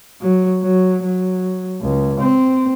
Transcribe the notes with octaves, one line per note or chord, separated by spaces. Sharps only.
F#3
F#3
F#3
C#2
C4